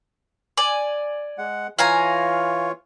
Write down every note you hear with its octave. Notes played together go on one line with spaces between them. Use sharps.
D5 G#5
G#3 F#5
E3 F4 C#5 F5 G#5 A#5